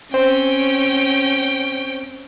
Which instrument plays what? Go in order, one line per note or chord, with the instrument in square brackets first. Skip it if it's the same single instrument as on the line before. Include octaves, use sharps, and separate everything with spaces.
[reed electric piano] C4 C5 [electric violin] C#4 G5